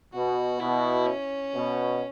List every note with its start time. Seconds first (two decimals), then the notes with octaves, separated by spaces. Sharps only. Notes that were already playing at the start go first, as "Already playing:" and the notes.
0.14 B2 F#4
0.60 B2 E4
1.06 C#4
1.53 B2